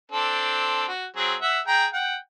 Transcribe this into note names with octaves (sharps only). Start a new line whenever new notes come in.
C4 D4 A4
F#4
F#3 C4 G#4
E5 F#5
G#4 G5 A#5
F#5 G5